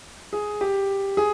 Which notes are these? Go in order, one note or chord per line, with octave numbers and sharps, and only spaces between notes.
G#4
G4
G#4